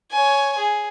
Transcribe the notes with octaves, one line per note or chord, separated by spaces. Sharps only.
C#5 G#5
G#4